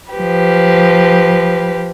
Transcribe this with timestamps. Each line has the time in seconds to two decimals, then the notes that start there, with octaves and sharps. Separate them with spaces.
0.12 F3 G4 B4